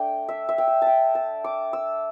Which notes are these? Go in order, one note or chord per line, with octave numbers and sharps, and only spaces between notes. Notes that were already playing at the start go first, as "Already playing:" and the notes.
Already playing: A3 D4 G5
E5
E5
G5
E5
G5 A5
A5
D6
E6